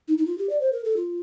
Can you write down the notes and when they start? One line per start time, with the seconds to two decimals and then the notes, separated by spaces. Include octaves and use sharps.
0.08 D#4
0.18 D#4
0.26 F4
0.38 G4
0.50 D5
0.61 C5
0.72 A#4
0.85 A4
0.97 F4